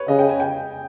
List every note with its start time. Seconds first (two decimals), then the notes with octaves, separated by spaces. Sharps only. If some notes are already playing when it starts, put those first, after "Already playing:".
Already playing: B4 C#5
0.08 C#3 D#5
0.19 G5
0.29 G#5
0.40 G5